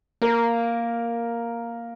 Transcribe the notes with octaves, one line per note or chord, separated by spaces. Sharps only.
A#3 A#4